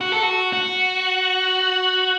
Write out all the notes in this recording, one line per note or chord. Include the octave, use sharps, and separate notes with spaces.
F#4
A4
F#4
F#4